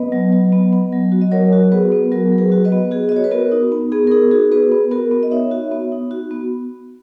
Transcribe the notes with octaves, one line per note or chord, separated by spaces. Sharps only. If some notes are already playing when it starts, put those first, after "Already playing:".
Already playing: B3 B4 D#5
F#3
F#3
B3
B3
F#3
F#4
D#5
F#3 A#4 C#5
F#4
B3 G#4 B4
B3
F#3 F#4 A#4
F#3
G#4 B4
F#4
B4 D#5
B3
F#4 G#4
D#5
F#4 C#5
B4
B3 F#4 A#4
D#4
B3
B3 G#4
A#4
D#4 G#4
F#4 G#4
B3 G#4 B4
B3
B3 F#4 A#4
B3
D#5
D#4 C#5 E5
F#4
B3
D#4
F#4
B3